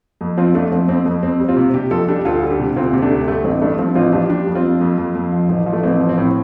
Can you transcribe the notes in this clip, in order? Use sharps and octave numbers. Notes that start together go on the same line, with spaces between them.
F2
F3 C4 F4
F2 A3 D4
F3 C4
F2 C4
F2
F2 C4
G3
C4 F4
C3
C3 D4 G4
F2 F4 A4
G3 D4 G4
D2 F4 A4
G3
D4 G4
C3
D2 C4 F4
C3
A3 D4
D2
G2 A3
A1 C4
G2 A3 D4
F3 C4
A1 C4 F4
F3 D4 G4
G3 D4 G4
F2
C4 F4
F2
F2
F2
F2
F3
A1
F3
A3
A1 C4
F3
C4
A2